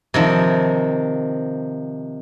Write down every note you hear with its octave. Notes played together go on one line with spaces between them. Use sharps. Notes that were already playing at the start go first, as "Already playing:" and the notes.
C3 D#3 F3